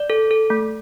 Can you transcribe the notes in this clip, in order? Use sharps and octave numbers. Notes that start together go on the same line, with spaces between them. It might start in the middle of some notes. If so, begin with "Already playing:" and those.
Already playing: D5
A4
A4
A3